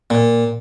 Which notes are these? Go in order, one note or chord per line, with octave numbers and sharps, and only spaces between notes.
A#2